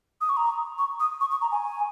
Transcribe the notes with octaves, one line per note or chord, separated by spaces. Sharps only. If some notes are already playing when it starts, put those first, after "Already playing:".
D#6
C#6
A#5
C#6
D#6
C#6
C#6
A#5
G#5